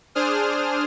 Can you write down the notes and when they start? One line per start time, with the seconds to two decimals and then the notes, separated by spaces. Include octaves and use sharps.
0.15 D4 G#4 C5 D#6 F6